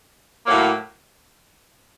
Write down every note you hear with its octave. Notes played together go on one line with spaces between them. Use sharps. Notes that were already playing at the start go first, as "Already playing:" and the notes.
A2 F#3 A#3